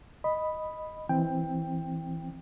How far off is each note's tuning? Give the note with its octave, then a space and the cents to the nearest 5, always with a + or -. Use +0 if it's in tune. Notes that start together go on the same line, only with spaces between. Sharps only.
D#5 +0 B5 +0
E3 +0 C4 +0 G5 +10